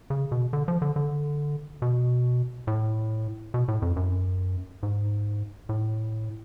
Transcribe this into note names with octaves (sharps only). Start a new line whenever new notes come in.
C#3
B2
D3
F3
D3
D3
B2
A2
B2
A2
F2
F#2
G#2
A2